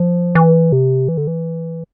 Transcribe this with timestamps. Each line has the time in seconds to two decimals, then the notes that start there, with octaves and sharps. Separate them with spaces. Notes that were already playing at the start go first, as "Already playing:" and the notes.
Already playing: F3
0.35 E3
0.72 C3
1.08 E3
1.17 D3
1.27 E3